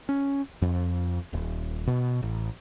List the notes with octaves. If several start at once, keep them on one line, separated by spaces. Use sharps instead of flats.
C#4
F2
D#1
B2
A1